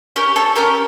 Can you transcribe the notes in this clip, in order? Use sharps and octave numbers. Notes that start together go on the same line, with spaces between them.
C#4 G4 A#4
A4 C#5
C#4 G4 A#4